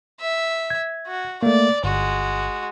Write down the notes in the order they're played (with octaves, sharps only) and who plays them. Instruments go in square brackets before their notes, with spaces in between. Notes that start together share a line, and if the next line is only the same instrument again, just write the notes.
[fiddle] E5
[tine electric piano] G#6
[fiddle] F#4
[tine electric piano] A3 A#3 [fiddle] D5
[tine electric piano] G1 [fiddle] G#3 F#4